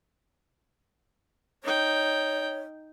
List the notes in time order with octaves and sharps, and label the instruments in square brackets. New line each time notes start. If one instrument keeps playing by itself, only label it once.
[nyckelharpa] D#4 G5 [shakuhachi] C#5